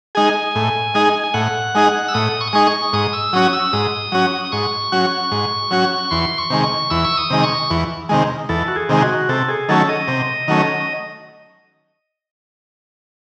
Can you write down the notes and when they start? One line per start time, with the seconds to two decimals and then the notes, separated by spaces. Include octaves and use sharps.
0.15 G#3 D#4 G#4 G#5
0.55 A2
0.94 G#3 D#4 G#4
1.24 G#5
1.34 A2 F#5
1.75 G#3 D#4 G#4
2.08 E6
2.14 A2 D#6
2.41 C#6
2.47 D#6
2.53 G#3 D#4 G#4 C#6
2.67 C#6
2.93 G#2 D#6
3.13 E6
3.33 F#3 C#4 F#4 D#6
3.53 E6
3.73 G#2 D#6
4.12 F#3 C#4 F#4
4.45 D#6
4.52 G#2 C#6
4.92 F#3 C#4 F#4
5.32 G#2
5.71 F#3 C#4 F#4
6.11 E2 C6
6.38 C#6
6.50 C3 D#3 G#3
6.64 C#6
6.90 E2 E6
7.05 C#6
7.17 D#6
7.30 C3 D#3 G#3
7.44 C#6
7.70 E2
8.09 C3 D#3 G#3
8.49 E2 A4
8.68 F#4
8.76 G#4
8.89 C3 D#3 G#3
9.02 F#4
9.29 C3 A4
9.49 G#4
9.69 D#3 F#3 A3 C#4 A4
9.89 D#5
10.08 C3
10.48 D#3 F#3 A3 C#4